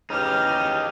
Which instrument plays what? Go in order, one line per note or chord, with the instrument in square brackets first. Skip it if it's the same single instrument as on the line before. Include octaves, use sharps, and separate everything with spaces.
[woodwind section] C#3 E3 F6 [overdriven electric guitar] D#4 G4